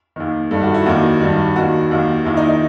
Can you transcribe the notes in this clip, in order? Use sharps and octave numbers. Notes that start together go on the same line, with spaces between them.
D#2 D#3
G2 D#3 A4
F#4
E4
D#2 D#3 F#4
G2 D#3
D#2 D#3 F#4
D#2 D#3
D#2 D#3 E4
D#4
D#4